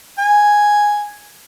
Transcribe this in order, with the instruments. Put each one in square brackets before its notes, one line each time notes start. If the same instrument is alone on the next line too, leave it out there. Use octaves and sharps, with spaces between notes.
[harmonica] G#5